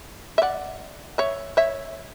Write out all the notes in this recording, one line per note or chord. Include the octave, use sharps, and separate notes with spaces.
E5
D5 F#5
C#5 E5
C#5 E5